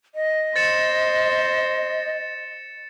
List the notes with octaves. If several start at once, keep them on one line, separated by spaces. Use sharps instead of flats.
D#5
C5 A6 C#7 E7